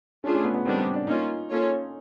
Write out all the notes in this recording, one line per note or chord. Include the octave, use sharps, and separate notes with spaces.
A3 C#4 D4 F4 G#4
C#4
B3
B3
D#3 G3 B3 C4 D4
C4
D4
A#3 C#4 D#4 F4
A#3 C#4 F4 A4 C#5